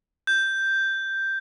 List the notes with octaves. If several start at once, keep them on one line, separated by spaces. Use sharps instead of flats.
G6